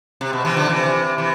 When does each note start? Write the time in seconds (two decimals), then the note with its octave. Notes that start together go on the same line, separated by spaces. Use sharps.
0.21 C3
0.33 B2
0.45 C3 E3
0.56 D3 F3
0.69 C3 E3
1.18 C3 E3